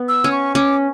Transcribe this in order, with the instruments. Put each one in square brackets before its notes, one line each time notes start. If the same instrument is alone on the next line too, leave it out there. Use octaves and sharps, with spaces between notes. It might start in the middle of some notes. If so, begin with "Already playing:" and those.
Already playing: [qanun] B3
[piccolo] E6
[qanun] C#4
[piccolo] C#6
[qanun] C#4 [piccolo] D6